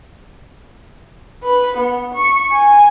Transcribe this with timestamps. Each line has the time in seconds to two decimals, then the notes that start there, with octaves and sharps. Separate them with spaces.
1.43 B4
1.77 B3
2.14 C#6
2.52 G#5